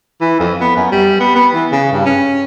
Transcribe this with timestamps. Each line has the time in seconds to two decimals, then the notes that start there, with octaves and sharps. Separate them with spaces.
0.21 E3
0.40 F2
0.61 B3
0.76 F#2
0.92 G3
1.20 B3
1.35 B3
1.54 E3
1.72 C#3
1.92 G2
2.05 C#4